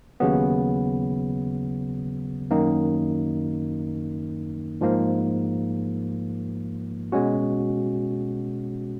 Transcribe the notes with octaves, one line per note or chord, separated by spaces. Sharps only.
D#2 C#3 F#3 B3
F#2 D#3 A#3 D#4
G#2 F3 A#3
B2 G#3 C#4 F#4